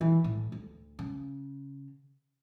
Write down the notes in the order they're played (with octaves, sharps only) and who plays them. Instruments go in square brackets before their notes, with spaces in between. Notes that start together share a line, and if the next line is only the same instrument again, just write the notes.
[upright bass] E3
A2
D2
C#3